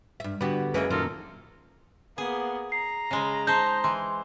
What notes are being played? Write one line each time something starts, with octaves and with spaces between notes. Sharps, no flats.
G2 E5
D3 B3 F#4 G4 B4
F#2 C#3 E3 G#3 A#3 G#4 B4
F#2 A#2 D#3 A#3 F4 A4 A#4
A#3 B3 G#4
A#5 C7
C#3 G#3
D#4 C5 A5 G6
E3 C6